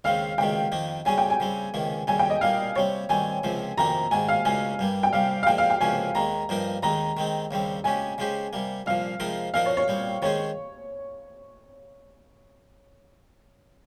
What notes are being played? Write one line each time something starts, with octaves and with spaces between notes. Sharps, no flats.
D#2 C#3 G#3 C4 F5
C#2 C3 D#3 G#3 G5
F2 D#3 A#3 D#4
C#3 G3 C#4 G#4 G#5
G5
G#5
C#3 G3 C4
C#2 C3 D#3 A#3
D#2 C#3 G3 G#5
G5
D#5
A#2 G3 A#3 F5
C3 G3 C4 C#5
D#3 G3 C4 G#5
C#2 C3 F3 C4
F2 C3 D#3 A#3 D#4 A#5
G#2 D#3 A#3 G#5
F5
C#2 C#3 G#3 D#4 G#5
G2 G3 A#3
G5
C2 C3 G3 F5
F5
A#2 F3 G#3 G5
F5
G5
C#2 C3 F3 A#3 C#4 G#5
D#2 D#3 G#3 A#5
G2 F3 A#3 D#4 A#4
D#2 D#3 G#3 D#4 A#5
D#3 G#3 C4 D#4
D#2 C#3 G3 C4
C#3 G#3 C#4 G4 G#5
C#3 G#3 C#4 G4 C5
C3 G3 A#3
C2 A#2 F3 F5
C3 F3 G#3 D#4 A#4
A#2 F3 A#3 D#4 A#4 F5
C#5
C#5
A#2 G3 C4
D#3 G#3 C#4 G#4 C5 C#5